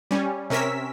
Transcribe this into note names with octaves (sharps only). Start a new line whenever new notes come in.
G3 C#4
C3 C#4 A#4 E6 B6